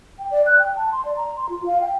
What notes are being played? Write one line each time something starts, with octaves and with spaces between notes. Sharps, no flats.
G5
D5
F#6
G5
A5
C6
D5
A#5
C6
F4
F5
G5